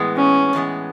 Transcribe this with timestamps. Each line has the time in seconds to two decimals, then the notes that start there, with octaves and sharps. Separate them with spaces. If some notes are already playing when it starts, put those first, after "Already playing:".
Already playing: A2 E3 G#3 B3
0.17 C#4
0.53 A2 E3 G#3 B3